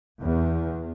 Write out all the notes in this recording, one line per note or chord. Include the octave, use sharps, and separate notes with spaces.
E2